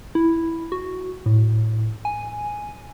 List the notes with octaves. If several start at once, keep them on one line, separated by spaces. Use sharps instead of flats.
E4
F#4
A2
G#5